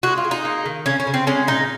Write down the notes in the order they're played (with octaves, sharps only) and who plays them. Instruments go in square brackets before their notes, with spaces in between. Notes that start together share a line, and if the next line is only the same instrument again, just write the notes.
[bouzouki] G#3 F#4
F4
G#3
D#4
A#3
D#3
C#3 C#4
C#4
C#3
C4
G#3 C#4
A#2 D#4